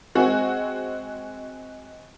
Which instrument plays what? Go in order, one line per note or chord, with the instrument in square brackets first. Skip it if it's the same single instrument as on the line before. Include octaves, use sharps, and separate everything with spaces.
[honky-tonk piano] G#3 C4 F#4 G#4